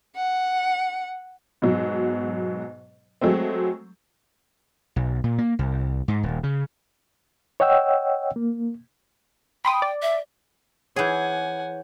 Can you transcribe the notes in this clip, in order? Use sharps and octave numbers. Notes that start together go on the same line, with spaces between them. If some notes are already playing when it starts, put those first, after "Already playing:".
F#5
G#2 B2 F#3
F#3 G#3 A3 C4
B1
A#2
A#3
C2
G#2
D#1
C#3
C#5 D#5 F#5 G5 E6
A#3
G5 B5 C6 D#6
D5
E5
E3 G#4 C#5 F#5 G#5 G6